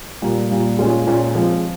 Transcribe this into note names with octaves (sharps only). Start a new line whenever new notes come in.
A#2 G3 A#3
A#2 G3 A#3
A#2 G#3 C#4 F4
A#2 G#3 C#4 F4
F3 G#3 C4